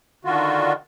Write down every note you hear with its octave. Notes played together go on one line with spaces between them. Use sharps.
D3 D#3 F4 F#4